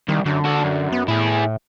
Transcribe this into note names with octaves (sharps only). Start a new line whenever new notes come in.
C2 D#3
F#2 D3
F#4 A4
F#2
B3
A2 E4 G#4